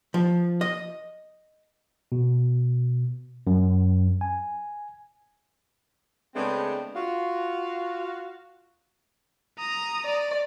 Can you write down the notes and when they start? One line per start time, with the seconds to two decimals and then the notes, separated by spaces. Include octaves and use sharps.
0.14 F3
0.61 D#5
2.12 B2
3.47 F#2
4.21 G#5
6.35 C#3 G#3 A3 B3 C4 D4
6.95 F4 F#4 F5
9.59 A#5 D#6
10.03 D5